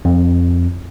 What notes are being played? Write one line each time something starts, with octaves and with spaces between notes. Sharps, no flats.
F2